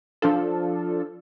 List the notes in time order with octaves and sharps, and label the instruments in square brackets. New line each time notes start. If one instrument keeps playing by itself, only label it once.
[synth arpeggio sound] F3 D4 F4 A4